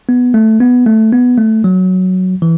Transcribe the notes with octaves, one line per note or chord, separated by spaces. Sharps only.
B3
A3
B3
A3
B3
A3
F#3
E3